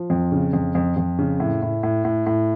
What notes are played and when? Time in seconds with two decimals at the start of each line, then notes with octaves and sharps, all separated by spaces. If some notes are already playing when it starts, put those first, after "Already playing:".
Already playing: F3
0.10 F2
0.32 C#3
0.53 F2
0.75 F2
0.97 F2
1.19 C#3
1.40 A2
1.62 A2
1.83 A2
2.05 A2
2.26 A2